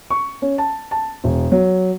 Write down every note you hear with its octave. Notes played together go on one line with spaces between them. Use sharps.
C#6
C#4
A5
A5
E1
F#3